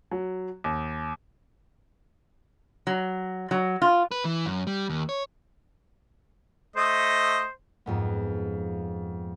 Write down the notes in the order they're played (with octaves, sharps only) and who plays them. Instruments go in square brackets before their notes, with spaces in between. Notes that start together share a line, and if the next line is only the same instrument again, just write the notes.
[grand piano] F#3
D#2
[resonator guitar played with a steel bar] F#3
F#3
F4
[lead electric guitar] B4
E3
F#2
G3
D#2
C#5
[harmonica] A3 D#5 [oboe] C5
[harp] F2 G#2 B3